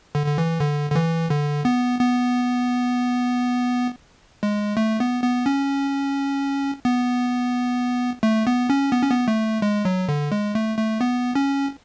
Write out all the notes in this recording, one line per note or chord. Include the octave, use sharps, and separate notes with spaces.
D3
D3
E3
D3
D3
E3
D3
B3
B3
G#3
A3
B3
B3
C#4
B3
A3
B3
C#4
B3
C#4
B3
A3
G#3
F#3
D3
G#3
A3
A3
B3
C#4